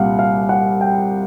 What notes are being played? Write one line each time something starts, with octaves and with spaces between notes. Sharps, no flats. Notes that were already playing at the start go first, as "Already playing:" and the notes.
Already playing: C2 A#2 G3 F5 F#5
F5
F#5
G5